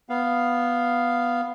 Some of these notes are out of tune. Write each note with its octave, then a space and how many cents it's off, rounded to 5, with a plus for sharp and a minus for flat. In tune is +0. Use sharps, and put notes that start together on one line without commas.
B3 +0 F5 +0